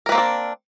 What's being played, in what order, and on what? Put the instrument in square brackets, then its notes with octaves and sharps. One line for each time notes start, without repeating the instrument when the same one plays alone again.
[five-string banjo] A#4
B4
A#3
C4
D4